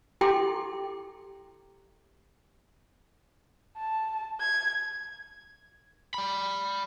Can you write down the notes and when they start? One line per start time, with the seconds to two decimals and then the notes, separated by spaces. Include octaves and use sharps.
0.21 E4 G4 A4 G5 C6 D6
3.78 A5
4.40 G#6
6.14 D5 B5